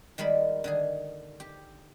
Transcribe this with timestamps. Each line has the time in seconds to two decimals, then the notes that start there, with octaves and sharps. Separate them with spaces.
0.18 D#3 G3 G#3 A#4 B5
0.64 D3 D#3 G#4
1.40 G4